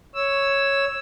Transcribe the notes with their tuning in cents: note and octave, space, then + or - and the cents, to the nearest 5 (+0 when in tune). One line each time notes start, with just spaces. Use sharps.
C#5 +0 E6 +0